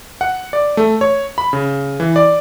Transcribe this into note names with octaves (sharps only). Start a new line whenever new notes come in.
F#5
D5
A3
C#5
B5
C#3
E3
D5